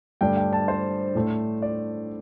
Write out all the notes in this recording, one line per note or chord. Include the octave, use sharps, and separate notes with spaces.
G2 D3 A3 D4 G5
G5
A5
C5
A2 A3 D4
D5